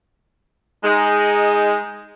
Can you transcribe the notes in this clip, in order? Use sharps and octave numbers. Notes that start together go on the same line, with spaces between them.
G#3 D#4